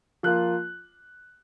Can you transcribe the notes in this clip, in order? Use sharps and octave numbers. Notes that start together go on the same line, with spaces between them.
F3 A#3 F4 F#6